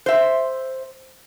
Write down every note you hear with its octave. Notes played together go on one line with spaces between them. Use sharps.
C5 E5